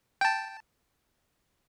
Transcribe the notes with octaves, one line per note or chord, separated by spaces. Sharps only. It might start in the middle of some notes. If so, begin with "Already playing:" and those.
G5 A5